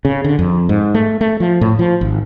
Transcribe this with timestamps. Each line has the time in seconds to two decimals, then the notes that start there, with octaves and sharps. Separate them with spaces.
0.05 C#3
0.24 D3
0.39 F2
0.69 G#2
0.94 A3
1.21 A3
1.40 F3
1.61 A2
1.79 F3
2.01 G#1